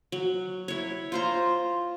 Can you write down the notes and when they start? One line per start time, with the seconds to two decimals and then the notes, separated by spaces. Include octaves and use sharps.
0.12 F#3
0.68 E4 C#5
1.12 F4 C5 A#5